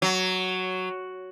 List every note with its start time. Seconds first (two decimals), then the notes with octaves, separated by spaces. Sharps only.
0.02 F#3